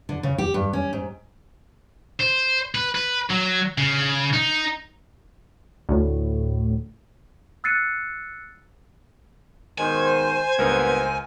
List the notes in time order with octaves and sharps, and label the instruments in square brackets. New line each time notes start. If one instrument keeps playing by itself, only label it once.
[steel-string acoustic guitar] D3
C#3
G4
G2
C#4
G#2
[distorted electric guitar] C5
B4
B4
F#3
C#3
D#4
[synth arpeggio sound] D2 A2
[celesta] E6 F#6 A6 C7 C#7 D#7
[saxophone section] G#2 B2 D#3 [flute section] C5 [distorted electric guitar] G#5
[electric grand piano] C#2 A#4 [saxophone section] G2 A#2 B3